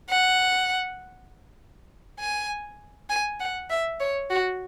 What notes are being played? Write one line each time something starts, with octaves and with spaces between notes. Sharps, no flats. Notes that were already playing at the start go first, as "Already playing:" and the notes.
F#5
G#5
G#5
F#5
E5
C#5
F#4